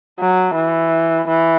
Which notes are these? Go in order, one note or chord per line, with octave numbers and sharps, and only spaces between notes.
F#3
E3
E3